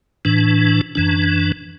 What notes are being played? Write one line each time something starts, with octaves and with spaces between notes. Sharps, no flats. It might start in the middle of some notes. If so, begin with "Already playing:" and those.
A2 E3 D4
F#2 E3 D4